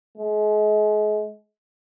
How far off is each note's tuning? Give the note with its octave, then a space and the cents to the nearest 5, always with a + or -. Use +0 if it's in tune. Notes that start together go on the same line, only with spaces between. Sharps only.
G#3 +35